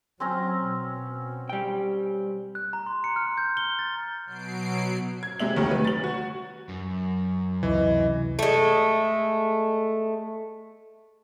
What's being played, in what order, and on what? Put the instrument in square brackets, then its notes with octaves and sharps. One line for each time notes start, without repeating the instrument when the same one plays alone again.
[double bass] F#3 [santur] C4 C#4 A#5
[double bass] B2
[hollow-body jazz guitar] G3 G5
[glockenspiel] F#6
A#5
C6
C#7
F6
G6
G7
A6
[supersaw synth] B2 F#3 C7 D7
[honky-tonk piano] G#6
C3 G#3 E5 F#7
D2 D#3 F#3 G3 A3
B4
A6 F#7
F#4
[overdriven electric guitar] F#2
[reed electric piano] C#2 C3 [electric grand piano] E3 [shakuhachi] D#5
[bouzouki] G#3 A3